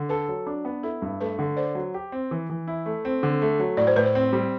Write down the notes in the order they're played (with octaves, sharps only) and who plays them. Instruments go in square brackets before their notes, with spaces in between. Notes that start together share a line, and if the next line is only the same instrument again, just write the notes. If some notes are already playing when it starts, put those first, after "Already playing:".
Already playing: [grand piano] D3
[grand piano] A4 [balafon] B4
[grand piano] F#3
D4
B3
[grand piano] E4 [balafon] A4
[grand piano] G2
[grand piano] A3 [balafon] B4
[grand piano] D3
[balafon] C5 [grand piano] D5
[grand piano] F#3
G4
C4
E3
E3
E4
A3
C4
D3
A3
F#3
[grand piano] A2 [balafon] D5
[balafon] C5
[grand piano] A2 [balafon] B4
[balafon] C5
[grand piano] C4
G3